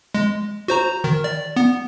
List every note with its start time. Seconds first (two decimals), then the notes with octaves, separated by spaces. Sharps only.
0.14 G#3
0.68 F#4 C5 A#5
1.04 D#3
1.24 D5
1.56 B3